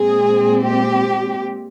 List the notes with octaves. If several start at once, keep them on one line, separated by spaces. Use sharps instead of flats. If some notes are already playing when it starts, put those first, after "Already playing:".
Already playing: A#2 G#3 C4 G#4
G4